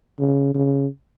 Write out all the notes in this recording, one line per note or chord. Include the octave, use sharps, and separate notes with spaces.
C#3
C#3